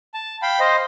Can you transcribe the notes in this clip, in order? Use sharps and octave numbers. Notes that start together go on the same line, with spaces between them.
A5
F5 G5 B5
C5 D#5 F5